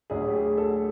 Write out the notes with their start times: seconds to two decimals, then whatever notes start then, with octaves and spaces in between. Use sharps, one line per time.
0.10 D2 D3 F#3 G#4
0.25 G4
0.33 G#4
0.58 A4